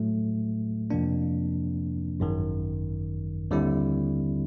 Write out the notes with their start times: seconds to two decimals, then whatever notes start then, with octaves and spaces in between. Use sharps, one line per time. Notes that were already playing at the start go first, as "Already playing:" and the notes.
Already playing: A2 F#3 A3
0.90 F2 C3 F3 A#3 D4
2.20 G#1 F#2 D#3
3.51 D#2 D3 G3 C4 E4